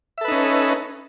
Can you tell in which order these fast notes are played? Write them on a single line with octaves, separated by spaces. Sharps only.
E5 A4 B4 D#4 C#4